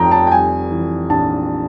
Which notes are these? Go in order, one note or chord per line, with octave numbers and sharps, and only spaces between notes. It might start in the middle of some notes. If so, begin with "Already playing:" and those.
Already playing: F1 F2 C3 G5 A#5
A5
G5
G3 G#5
E3
A#1 A5